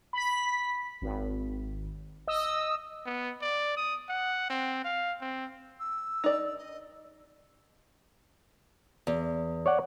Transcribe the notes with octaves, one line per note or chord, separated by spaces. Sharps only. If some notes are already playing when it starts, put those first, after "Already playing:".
B5 B6
G#1
D#5 D#6 E6
B3
D5
D#6
F#5
C4
F5
C4
E6
D#4 D5
D#5
E2
C#5 D5 F#5